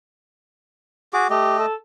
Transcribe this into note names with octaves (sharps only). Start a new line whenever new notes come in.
F#4 G#4 D6
A3 G4 D#5
A4